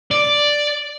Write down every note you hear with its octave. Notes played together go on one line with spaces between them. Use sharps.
D5